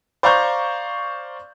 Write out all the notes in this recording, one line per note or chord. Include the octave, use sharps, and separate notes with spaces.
C5 D5 F5 A#5 C#6 G6